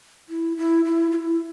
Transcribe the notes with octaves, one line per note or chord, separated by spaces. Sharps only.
E4
E4
E4
F4
E4